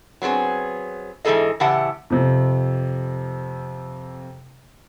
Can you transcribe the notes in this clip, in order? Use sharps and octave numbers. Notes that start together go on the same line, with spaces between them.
F#3 B3 C4 G#4
G#2 E3 G3 G#4 A4 D#5
A2 C#3 E3 G4 F#5 A5
F2 C3